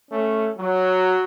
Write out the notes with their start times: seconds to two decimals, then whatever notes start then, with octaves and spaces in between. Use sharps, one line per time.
0.11 A3 C#4
0.58 F#3